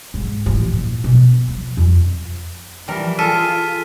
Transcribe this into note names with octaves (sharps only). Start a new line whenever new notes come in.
G#2
A1 F3
A#2
B2
F3
F2
E3 F3 G3 A#4
F4 G#4 A4 F6 B6 D#7